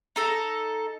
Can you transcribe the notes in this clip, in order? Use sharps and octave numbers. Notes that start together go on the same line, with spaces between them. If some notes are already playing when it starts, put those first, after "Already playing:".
D#4 A4 A#5